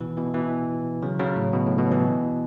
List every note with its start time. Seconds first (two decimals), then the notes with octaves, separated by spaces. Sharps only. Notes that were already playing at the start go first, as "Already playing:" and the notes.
0.01 B2 E3
0.17 B2 E3
0.34 B2 E3
1.02 C#3 F#3
1.19 C#3 F#3
1.36 A2
1.53 B2
1.66 A2
1.78 B2
1.91 B2 E3